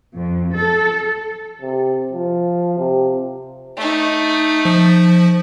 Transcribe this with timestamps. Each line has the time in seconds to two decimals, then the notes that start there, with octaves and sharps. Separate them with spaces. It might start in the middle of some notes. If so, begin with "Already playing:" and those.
0.16 F2
0.55 A4
1.62 C3
2.13 F3
2.78 C3
3.77 A3 D#4
4.65 F3